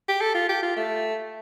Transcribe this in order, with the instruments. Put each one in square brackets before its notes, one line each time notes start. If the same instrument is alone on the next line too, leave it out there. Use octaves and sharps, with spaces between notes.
[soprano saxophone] G4
A4
F4
G4
F4
A3